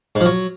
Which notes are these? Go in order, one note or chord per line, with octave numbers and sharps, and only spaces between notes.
G#2
F3
F#3